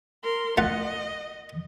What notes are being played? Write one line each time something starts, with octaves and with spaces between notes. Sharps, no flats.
A#4 C6
A3 F4 D#5 F#5